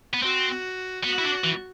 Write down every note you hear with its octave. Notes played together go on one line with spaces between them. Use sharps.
B3
C4 F#4
B3 F#4
E4
D4
E3